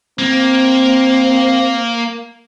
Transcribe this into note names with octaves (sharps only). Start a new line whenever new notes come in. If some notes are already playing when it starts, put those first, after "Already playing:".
A#3 C4